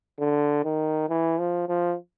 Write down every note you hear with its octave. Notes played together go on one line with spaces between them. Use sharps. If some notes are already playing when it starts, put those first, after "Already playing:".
D3
D#3
E3
F3
F3